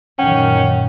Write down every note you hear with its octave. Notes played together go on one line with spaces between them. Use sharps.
F#2 A#2 D#3 C#4 F#5 G5